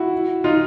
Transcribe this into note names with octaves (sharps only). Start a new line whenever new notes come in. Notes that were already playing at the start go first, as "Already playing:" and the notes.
Already playing: E4 F#4
D#4 F4